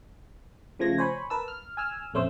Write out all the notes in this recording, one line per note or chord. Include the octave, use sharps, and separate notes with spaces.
C#3 F3 A3 G#6 A#6
C5 C#5 G#5 B5 C#6
A#4 B4 A5 E6
F6
G#5 E6 F6
A#1 F2 A3 C#4 C5 E6